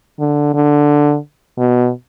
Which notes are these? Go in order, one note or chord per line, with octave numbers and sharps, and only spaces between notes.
D3
D3
B2